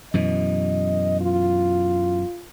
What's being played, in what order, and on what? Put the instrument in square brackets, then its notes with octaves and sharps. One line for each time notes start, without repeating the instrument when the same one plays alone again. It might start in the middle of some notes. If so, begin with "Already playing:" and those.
[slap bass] F#2 B2 E3 [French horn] D#5
[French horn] F4